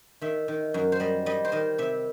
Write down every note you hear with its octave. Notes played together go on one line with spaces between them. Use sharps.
D#3 E5
D#3
F#2
C5
G3 D#5
G3 D#5
C5
D#3 D#5
C3 E5